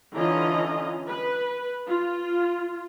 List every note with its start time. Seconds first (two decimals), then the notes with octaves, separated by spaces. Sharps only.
0.14 D3 E3 C#4 F4 D#5 A#5
1.08 B4
1.87 F4